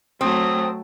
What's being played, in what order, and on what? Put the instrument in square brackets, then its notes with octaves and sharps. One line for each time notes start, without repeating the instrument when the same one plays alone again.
[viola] F#3 A3 [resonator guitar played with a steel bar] C4 [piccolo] D#6